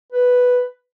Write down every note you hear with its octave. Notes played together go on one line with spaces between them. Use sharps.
B4